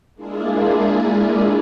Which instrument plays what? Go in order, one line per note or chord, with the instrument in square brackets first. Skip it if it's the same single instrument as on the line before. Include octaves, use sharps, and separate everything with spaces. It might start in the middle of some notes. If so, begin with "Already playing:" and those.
[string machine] G#3 A#3 D4 E4 F4 G#4